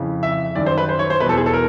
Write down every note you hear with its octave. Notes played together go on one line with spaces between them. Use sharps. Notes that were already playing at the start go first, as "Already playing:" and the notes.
Already playing: F2 C#3 E3
E5
F#2 D#3 D5
C5
B4
C5
C#5
C5
B2 B4
E2 A4
G#4
A4
A#4